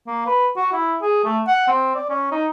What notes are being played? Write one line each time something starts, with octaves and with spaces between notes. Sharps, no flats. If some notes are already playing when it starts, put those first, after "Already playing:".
A#3
B4
F#4
E4
G#4
A3
F#5
C4
D5
C#4
D#4